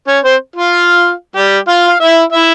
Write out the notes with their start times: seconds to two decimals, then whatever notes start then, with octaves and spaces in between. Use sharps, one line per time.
0.07 C#4 C#5
0.24 C4 C5
0.56 F4 F5
1.36 G3 G4
1.68 F4 F5
1.88 F5
2.00 E4 E5
2.32 E4 E5